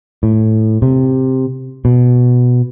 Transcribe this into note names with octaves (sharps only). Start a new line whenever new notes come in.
A2
C3
B2